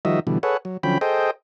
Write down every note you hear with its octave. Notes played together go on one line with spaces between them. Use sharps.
D#3 F3 G3 F#4 D#5 E5
B2 D3 E3 G3
G#4 A4 B4 C#5 F#5
F#3
D3 F3 F#3 C#4 G5 B5
G#4 A4 C5 D#5 G5